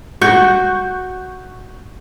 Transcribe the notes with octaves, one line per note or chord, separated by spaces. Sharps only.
F#4 C#6 F#6 G6